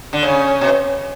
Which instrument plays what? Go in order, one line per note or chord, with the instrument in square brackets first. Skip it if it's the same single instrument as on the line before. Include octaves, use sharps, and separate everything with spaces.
[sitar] D3
[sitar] C#3 [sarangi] C#4
[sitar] B2